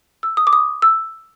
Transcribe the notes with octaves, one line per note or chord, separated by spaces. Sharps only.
E6
D#6
D6
D#6
E6